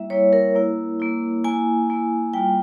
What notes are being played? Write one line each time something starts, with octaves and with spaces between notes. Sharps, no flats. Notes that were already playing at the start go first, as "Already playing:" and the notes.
Already playing: G3 A#3 E4 E5
G3 A#3 E4 C#5
A#4
A#3 E4
A#3 E4
A#3 E4 G#5
A#3 E4
G3 A#3 F4 G5